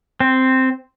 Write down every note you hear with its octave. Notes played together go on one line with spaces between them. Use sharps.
C4